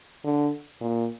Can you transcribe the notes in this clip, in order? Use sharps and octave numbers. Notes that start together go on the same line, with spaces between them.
D3
A#2